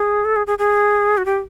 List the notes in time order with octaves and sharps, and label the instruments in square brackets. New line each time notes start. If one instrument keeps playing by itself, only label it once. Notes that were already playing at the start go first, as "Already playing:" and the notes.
Already playing: [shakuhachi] G#4
A4
G#4
G#4
G#4
F#4
G4